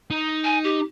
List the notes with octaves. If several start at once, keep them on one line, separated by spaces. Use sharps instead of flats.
D#4
G#5
G4